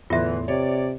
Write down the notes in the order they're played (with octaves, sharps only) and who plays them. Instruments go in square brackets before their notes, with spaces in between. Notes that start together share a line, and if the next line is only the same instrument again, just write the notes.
[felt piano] E2 A2 C6 [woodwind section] D3 E3 [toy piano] F4 E5
[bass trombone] C3 [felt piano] C#5 [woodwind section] D5